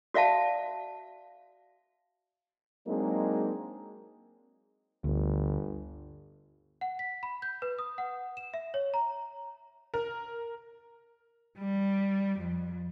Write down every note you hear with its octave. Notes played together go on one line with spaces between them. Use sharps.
F#4 D5 E5 F5 A5
F#3 G#3 A#3 C4 D4 D#4
G1 D2
F#5
B6
B5
G6
B4
D#6
F#5
E7
E5
C#5
A#5
A#4
G3
F2